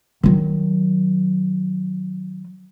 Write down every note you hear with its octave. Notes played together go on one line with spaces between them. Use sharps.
D#3 F#3